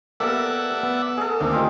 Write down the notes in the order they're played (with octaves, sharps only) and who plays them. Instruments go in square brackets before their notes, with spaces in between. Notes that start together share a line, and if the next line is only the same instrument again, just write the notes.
[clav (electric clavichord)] A#3 B3 G4 [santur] A4 A#4 [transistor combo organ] D5 E5 F#5
[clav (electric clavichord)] B3
[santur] G#4 A4
[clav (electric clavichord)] D2 D#3 C4 [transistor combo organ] A#3 [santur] D4
[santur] D#4 F4 G4